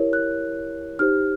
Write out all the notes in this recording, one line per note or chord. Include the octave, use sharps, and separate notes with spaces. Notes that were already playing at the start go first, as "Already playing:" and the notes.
Already playing: E4 G4 A#4 C#5
F#6
D#4 G4 C5 F6